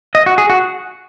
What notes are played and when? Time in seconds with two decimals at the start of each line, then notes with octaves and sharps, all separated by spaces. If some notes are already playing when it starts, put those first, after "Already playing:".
0.15 D#5
0.26 F#4
0.38 G#4
0.50 F#4